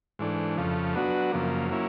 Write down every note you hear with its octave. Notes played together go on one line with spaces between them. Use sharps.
G#2 E3 A3 D4
F2 C#3 F3 A3
F#3 B3 D4 F#4
F#2 C#3 F3 A#3
F#3 A#3 C#4 E4